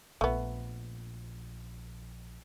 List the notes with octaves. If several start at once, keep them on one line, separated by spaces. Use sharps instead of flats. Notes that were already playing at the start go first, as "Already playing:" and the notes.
A#1 A3 B3